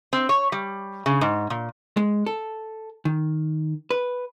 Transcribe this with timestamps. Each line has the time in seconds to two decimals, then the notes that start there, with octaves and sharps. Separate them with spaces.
0.13 C4
0.29 C#5
0.52 G3
1.06 C#3
1.21 G#2
1.50 A#2
1.97 G#3
2.26 A4
3.05 D#3
3.91 B4